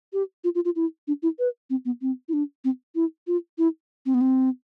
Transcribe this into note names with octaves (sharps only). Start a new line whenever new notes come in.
G4
F4
F4
F4
E4
D4
E4
B4
C4
B3
C4
E4
D4
C4
E4
F4
E4
C4
B3
C4